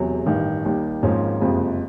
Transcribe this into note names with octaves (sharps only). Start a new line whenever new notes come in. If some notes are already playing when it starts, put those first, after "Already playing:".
Already playing: E1 E2 C3 F#3
A1 G2 D#3
D#2 D#3 G3
G#1 G#2 F3 A#3 C#4
F#1 F2 C3 F3 G#3